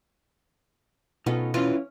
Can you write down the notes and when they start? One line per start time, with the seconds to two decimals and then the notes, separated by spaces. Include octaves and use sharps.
1.26 B2 B3 C#4 D#4 F4 A4
1.54 E2 E3 C#4 E4 F4